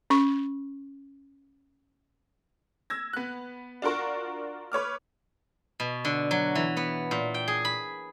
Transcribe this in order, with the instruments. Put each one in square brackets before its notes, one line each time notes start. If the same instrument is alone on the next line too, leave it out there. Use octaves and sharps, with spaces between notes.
[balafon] C#4 C#6
[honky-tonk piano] E6 G#6 A#6
B3 F#6
D4 F4 F#4 A#4 C#6
B4 C#5 D6 F6
[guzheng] B2
D3
F#3
E3
B3
A#2
G5
G#4
B5